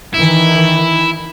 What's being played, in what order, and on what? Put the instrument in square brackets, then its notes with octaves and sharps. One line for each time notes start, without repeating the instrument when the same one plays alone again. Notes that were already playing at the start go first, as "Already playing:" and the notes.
[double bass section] D#3 E3 [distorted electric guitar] E4